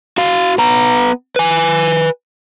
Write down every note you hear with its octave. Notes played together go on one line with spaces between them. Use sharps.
F#4 F5
B3 A#5
B4 G#5